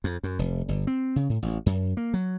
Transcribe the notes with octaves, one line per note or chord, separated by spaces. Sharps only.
F2
F#2
F1
G1
C4
C#3
A2
A1
F#2
A#3
F#3